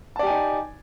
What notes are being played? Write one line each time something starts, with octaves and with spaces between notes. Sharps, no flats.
D#4 G4 D5 G#5 A5